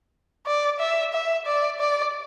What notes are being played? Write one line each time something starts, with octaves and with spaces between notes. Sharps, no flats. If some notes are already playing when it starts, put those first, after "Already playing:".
D5
E5
E5
D5
D5